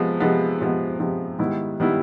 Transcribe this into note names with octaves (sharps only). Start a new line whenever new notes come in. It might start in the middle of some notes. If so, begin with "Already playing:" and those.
Already playing: C3 F3 G#3 B3
C3 F3 G#3 B3
C3 F3 G#3 B3
C3 F3 G#3 B3
G#2 D#3 G3 B3 E4
D#3 G3 B3 E4